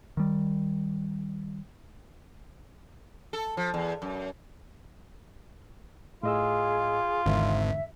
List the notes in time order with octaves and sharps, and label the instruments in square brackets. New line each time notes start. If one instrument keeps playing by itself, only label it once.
[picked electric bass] D#3 G3
[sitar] A4
F3
E2
F#2
[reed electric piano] A2 D#5 E6 [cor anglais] F4 [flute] G#4
[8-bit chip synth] G#1 [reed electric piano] E2 G#2 D3 [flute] E5